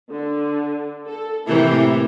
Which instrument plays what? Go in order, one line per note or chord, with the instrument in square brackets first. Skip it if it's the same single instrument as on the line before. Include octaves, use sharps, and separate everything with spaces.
[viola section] D3
A4
[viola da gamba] A2 C3 E3 [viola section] A#3 E4 A#4